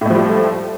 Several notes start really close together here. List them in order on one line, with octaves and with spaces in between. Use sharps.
A2 A3 F3 G3